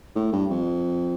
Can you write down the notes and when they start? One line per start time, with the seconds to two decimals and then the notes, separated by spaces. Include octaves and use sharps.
0.15 A2
0.32 G2
0.50 F2